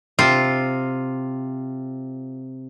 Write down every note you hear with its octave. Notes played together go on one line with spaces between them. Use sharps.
C3 F4